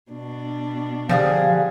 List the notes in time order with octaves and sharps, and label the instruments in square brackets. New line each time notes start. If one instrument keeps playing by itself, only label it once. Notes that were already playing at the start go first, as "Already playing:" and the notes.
[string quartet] B2 D4
[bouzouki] D3 G3 G#4 [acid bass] F3 [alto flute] F5